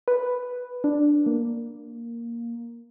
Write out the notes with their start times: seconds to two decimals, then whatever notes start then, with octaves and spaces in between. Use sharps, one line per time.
0.08 B4
0.84 D4
1.26 A#3